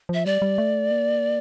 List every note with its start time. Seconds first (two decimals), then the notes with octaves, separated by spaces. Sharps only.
0.09 F3 E5
0.26 G3 D5
0.42 G3
0.58 A3
0.91 A#3